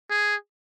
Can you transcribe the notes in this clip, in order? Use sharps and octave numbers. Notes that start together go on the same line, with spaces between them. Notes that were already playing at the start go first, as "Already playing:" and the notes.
G#4